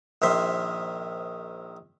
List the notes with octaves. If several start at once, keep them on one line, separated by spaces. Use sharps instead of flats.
A#1 D#3 C5 E5